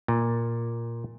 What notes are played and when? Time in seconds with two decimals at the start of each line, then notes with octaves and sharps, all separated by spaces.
0.08 A#2